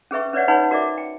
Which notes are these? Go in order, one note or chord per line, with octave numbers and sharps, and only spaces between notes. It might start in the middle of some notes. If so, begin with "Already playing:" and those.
C#4 G#4 B4 E5 C#6
C#4 B4 C#5 D5 E5 F#5
D#4 B4 C#5 F#5 G#5 B5
F#4 A#4 D5 E5 D6
G5